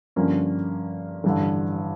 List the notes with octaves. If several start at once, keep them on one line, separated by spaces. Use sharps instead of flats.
G2 D3 F3 A#3 C#4
A1 G2 D3